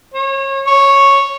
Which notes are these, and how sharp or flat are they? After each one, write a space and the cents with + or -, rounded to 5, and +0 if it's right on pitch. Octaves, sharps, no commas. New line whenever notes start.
C#5 -30
C#5 -5